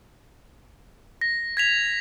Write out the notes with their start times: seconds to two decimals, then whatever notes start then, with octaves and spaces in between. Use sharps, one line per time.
1.21 A#6
1.57 G#6 B6 F7